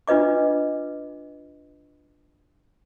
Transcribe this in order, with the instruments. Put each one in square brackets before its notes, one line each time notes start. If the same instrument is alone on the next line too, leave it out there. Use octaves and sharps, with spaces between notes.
[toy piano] D4 F4 B4 D#5 D6